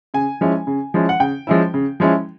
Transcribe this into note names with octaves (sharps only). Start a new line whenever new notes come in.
C#3 G#5
F3 G#3 C#4 E4
C#3
F3 G#3 C#4 E4
F#5
C#3 G5
F3 G#3 C#4 E4
C#3
F3 G#3 C#4 E4